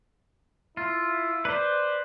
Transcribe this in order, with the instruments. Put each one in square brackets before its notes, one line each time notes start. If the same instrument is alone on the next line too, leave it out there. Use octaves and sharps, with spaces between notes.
[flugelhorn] E4 [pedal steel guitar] F4
[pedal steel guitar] B4 C5 [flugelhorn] D5